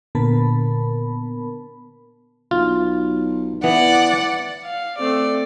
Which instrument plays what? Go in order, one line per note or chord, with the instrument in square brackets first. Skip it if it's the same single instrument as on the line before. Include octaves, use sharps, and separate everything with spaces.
[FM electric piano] A#2 D3 B3 A#4 A5 B5
[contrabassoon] B1 [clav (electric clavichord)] F4
[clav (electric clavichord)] E3 B3 [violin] D5 F#5
[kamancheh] F5
[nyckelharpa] A3 C4 [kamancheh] D5